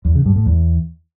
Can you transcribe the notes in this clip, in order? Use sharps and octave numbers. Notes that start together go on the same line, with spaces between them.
E2
C#3
G2
A2
E2